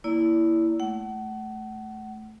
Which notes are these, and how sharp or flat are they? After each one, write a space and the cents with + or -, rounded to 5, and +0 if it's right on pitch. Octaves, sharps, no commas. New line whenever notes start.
A#3 +0 E4 +0 D5 -35
A3 -15 F#5 +30